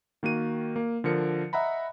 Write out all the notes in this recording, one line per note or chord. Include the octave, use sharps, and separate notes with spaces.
D#3 A#3 F#4 D#7
A#3
D3 F3 A#4 C#7
D#5 E5 F#5 A#5 B5